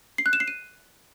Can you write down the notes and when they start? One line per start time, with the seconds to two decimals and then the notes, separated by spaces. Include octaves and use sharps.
0.18 C7
0.26 F#6
0.33 E7
0.40 C7
0.48 D#7